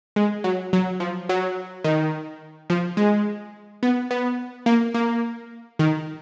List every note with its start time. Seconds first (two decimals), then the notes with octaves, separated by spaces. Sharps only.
0.16 G#3
0.44 F#3
0.73 F#3
1.00 F3
1.29 F#3
1.84 D#3
2.70 F3
2.97 G#3
3.83 B3
4.11 B3
4.66 A#3
4.94 A#3
5.79 D#3